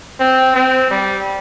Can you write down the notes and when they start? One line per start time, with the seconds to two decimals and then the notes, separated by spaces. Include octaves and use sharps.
0.20 C4
0.55 C4
0.91 G3